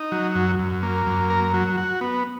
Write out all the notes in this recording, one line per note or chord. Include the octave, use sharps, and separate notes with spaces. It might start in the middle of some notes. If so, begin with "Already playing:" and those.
Already playing: D#4
F#3
F#2
F#2
A#3
F#2
A#4
F#3
F#4
B3